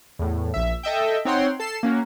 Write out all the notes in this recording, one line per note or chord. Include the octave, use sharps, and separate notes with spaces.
E2 A2
A#1 E5
A4 D#5 E5 G5
C4 D#4 C#5 F#5 G5 C6
A4 C7 E7
A#3 C#4 F#4